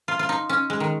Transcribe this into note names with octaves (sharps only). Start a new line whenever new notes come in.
F4
F4
D#4
C#4
G#3
D#3